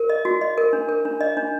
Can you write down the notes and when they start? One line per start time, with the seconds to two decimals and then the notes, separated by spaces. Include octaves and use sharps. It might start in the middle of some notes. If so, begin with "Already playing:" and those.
Already playing: A#4
0.10 D#5
0.25 F#4
0.41 D#5
0.58 A#4
0.73 D4
0.89 A#4
1.05 D4
1.21 D#5
1.37 D4